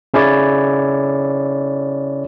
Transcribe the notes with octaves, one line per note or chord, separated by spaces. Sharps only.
C#3 C#4 E4 C#5 D5